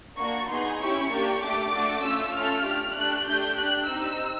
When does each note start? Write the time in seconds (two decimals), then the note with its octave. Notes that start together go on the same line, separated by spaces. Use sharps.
0.18 A#3 D4 F#4 C#6
0.49 B3 D#4 G#4 C6
0.80 C#4 E4 G4 C#6
1.10 A#3 D4 G4
1.41 A3 D4 G4 D6
1.72 A3 D4 F#4 A4
2.03 A3 C#4 F4 E6
2.34 A3 C#4 F4 A4 F6
2.65 D4 G4
2.95 A3 D4 G4 F#6
3.26 A3 D4 G4 G6
3.57 D4 G4 F#6
3.88 C4 D#4 G4 E6